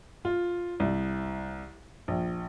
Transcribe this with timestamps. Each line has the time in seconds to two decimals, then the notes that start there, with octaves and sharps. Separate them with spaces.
0.25 F4
0.80 C2
2.08 A#1